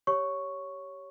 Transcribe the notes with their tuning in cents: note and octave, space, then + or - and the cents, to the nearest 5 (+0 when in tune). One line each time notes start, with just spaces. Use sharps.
G4 +0 C#5 +0 C#6 +0